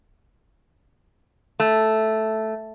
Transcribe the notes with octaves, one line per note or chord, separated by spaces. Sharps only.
A3